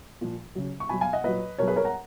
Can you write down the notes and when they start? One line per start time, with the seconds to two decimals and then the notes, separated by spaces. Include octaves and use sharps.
0.21 A#2 F3
0.55 C#3 F#3
0.80 C#6
0.89 B2 F#3 G#5 B5
1.01 F5 G#5
1.13 D#5 F#5
1.24 A#2 F#3 B4 D#5
1.58 B2 F#3 A#4 C#5
1.67 G#4 B4
1.76 A#4 C#5
1.85 F#5 A#5